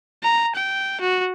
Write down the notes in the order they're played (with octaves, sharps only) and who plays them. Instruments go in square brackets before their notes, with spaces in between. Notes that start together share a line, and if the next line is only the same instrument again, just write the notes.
[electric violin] A#5
G5
F#4